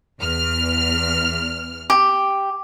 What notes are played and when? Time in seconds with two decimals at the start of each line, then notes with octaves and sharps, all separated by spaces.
0.20 E2 F6
1.90 G4